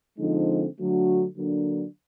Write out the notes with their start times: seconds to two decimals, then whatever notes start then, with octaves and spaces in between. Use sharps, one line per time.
0.18 D3 F3 G#3 C4 D#4
0.78 D3 F#3 A3 D4 F#4
1.36 D3 F#3 A#3 D4